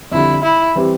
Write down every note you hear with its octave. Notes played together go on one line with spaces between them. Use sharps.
F2 D3 G3 E4
E4
E3 G3 C4 G4